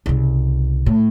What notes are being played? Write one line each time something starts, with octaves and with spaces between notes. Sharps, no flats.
C2 C#3
A2